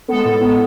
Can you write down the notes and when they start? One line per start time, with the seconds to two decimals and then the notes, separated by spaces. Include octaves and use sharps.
0.08 G#3 B3 A4
0.25 A2
0.41 G#3 B3